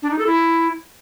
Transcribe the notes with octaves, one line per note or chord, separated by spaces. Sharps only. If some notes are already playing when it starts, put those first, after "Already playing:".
D4
D#4
A4
E4